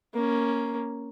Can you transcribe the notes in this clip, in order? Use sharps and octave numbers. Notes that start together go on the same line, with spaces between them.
A#3 C#4